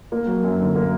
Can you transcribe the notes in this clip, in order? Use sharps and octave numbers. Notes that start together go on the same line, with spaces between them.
A#3
F#3
F#2
D3
A#3